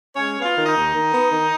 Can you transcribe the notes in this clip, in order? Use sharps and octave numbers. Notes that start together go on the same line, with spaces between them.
G#3 C#4 C#5
B3
F4 F5
D#3
D#4 D#5
D#2
D#3
B3
D#3